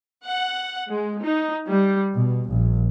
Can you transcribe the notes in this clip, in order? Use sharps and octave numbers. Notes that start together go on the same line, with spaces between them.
F#5
G#3
D#4
G3
B2
A#1